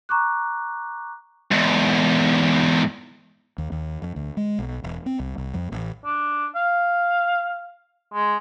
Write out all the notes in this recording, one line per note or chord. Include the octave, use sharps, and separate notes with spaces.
A#5 C#6 D6 F#6
E2 G#2
D#2
D#2
F2
D2
G#3
B1
E1
C4
C2
C2
F2
A1
D4
F5
G#3